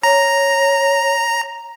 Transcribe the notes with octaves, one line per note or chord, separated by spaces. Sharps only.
C#5 A#5